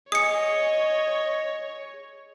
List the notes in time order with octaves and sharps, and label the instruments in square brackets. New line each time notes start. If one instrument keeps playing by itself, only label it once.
[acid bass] G#4 [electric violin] C#5 [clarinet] D#5 [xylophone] D#6 C#7